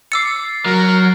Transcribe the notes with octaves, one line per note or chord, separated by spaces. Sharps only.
D6 E6 A6 C7 C#7
F#3 A#4